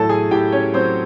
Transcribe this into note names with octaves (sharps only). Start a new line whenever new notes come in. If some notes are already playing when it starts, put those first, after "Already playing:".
Already playing: A2 F#3 A4 A5
G#4 G#5
A2 G4 G5
C#4 C#5
F#3 C4 C5